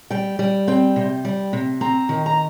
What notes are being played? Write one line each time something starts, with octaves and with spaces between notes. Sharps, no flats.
G3 G5
G3
C4 G5
C3
G3
C3
C4 A#5
D#3
A#5